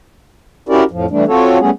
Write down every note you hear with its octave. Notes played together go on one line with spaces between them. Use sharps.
C#4 E4 F#4 G4 A#4 D5
F2 A2 F3
E3 G3 A3 D4
C4 F4 F#4 A4 C#5
G3 A3 B3 C#4 G#4